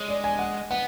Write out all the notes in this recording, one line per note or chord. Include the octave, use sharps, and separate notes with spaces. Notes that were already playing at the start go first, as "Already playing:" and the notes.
Already playing: G#3 C#5
D5
G#5
F#5
B3 F#5